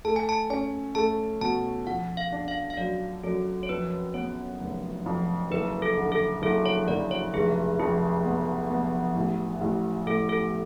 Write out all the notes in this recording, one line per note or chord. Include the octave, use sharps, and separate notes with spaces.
A3 A5
G#5
A5
C#4 G#5
A3 A5
B2 A5
F3 F#5
F5
D4
F5
F5
F#2 D5
F#2 A4
C#5
F2 B4
B3 C#5
F1
F2
F#1 B4
A4
D3
A4
F#1 A4
C#5
F#1 D5
C#5
F1 G#4
F2 G#4
B3
B3
A1
A1
A2 A4
A4